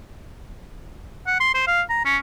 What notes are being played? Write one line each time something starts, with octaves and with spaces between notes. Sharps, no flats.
F#5
C6
C5
F5
A#5
C#4